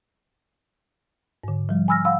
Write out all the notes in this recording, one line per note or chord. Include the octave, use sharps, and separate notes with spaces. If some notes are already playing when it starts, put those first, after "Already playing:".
G#2 D3
F3 G3
G#5 B5 E6 F6 A#6
F5 F#5 B5 C6 E6